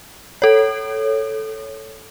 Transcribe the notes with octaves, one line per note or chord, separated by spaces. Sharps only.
A4 C#5